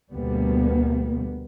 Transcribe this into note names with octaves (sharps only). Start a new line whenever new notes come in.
D2 B2 G3 A#3 B3